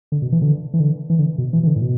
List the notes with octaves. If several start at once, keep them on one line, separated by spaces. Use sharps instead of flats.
D3
B2
E3
D3
E3
D3
E3
D3
B2
E3
E3
D3
A2
B2